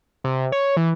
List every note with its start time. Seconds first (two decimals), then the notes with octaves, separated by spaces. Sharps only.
0.24 C3
0.52 C#5
0.77 E3